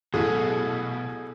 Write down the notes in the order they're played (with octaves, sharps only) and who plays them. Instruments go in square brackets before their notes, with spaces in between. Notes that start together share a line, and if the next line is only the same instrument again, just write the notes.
[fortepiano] A1 F#3 G#3 [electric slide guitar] B2 [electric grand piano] G#4 A4